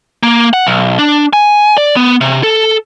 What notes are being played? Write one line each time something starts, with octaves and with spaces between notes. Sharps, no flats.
A#3
F#5
B1
D4
G#5
D5
B3
C3
A4